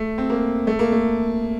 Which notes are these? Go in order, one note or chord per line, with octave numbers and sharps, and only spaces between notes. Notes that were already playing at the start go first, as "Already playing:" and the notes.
Already playing: A3
C4
A#3
A3
A#3
A3